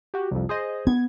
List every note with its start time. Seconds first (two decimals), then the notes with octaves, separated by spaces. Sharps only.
0.14 F#4 G4
0.31 C2 F2
0.49 G#4 C5 D#5
0.87 B3 G#6